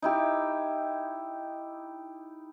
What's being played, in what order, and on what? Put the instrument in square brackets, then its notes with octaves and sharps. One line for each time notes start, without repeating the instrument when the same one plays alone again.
[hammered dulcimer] D#4 E4 G4